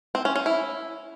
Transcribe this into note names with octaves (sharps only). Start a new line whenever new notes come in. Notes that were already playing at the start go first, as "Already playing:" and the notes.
C4
C#4
C#4
E4